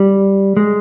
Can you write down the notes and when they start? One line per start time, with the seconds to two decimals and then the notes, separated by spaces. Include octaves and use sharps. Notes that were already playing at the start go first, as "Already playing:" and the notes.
Already playing: G3
0.57 G#3